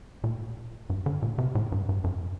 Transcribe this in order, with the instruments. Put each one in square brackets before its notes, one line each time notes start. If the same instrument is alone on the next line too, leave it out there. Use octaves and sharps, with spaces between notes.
[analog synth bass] A#2
G2
D3
A#2
C3
A2
G2
G2
F#2